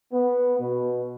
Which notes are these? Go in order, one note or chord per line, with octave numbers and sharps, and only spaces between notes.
B3
B2